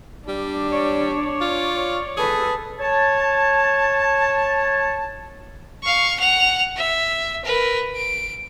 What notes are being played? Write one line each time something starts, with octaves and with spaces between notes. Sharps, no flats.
G3 D4
C#5 D5
F4
G#4 A4 B4
C#5 A5
F5 C#6
F#5 F7
E5
A#4 B4
D7